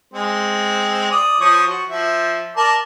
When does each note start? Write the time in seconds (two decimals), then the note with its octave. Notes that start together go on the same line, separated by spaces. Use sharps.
0.14 G#3 C4
1.11 D5 D#6
1.40 F3 C#5 D#6
1.67 F#4
1.90 F3 E5
2.57 A#4 D5 A5